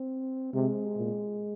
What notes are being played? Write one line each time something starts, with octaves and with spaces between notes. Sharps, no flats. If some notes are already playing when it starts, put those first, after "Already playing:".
Already playing: C4
C3 G#3
A#2